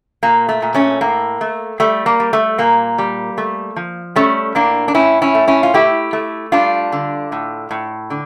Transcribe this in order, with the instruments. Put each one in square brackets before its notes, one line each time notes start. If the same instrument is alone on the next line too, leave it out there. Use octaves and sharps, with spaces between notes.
[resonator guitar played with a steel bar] A#2 A#3
A3
A#2
A3 C#4
A2 A#3
A3
G3 A3
A#3
G3
A3
A#2 A#3
G3
A3
F3
G3 A3 C#4
A2 A#3 D4
D4
A2 C#4 E4
C#4 E4
A3
C#4 E4
F4
A3 E4 G4
A3
G3 D4 F4
D3
A2
A2
D3